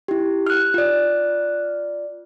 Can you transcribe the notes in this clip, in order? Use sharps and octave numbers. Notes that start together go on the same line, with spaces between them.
E4 G4
F6 F#6
F4 D5